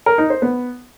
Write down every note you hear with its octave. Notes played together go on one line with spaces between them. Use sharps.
A#4
D#4
C5
B3